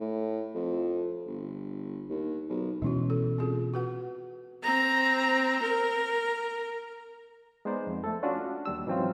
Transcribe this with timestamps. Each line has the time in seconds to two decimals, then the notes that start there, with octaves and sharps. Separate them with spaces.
0.01 A2
0.55 F2
1.27 G1
2.09 D#2
2.49 B1
2.82 B2 E3 G#3 C#4 E4 F#4
3.10 A4
3.38 C4 F4 G#4
3.74 F#4 B4 F#5
4.63 C4 A#5
5.62 A#4
7.65 G#3 B3 D#4 C5 D5
7.87 F2
8.04 A3 A4
8.23 C#4 D4 F4 F#4
8.65 D#2 G3 E6
8.87 G#2 E3 F#3 C4 C#4 F4